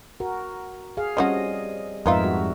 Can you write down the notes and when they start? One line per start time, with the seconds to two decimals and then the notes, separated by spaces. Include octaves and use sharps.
0.20 F#4 A#4
0.97 G#4 F5
1.17 F3 G3 C4 C#4 F#4 D#5
2.06 F2 G#2 B3 D#4 F4 A#4 E5
2.21 G3 F#4